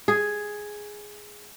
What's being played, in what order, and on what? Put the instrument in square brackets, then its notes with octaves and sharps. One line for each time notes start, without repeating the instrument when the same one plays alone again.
[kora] G#4